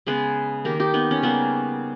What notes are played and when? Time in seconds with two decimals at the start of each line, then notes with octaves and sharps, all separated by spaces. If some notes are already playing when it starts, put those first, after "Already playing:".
0.07 C#3 G#3 B3 G#4 B4
0.65 D#3 A#3 G4 A#4
0.80 D#4 G4
0.94 B3 D#4
1.11 C#4
1.23 C#3 G3 A#3 B3